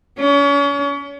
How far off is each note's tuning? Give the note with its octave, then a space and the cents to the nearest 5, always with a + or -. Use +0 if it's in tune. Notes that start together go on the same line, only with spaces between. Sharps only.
C#4 +35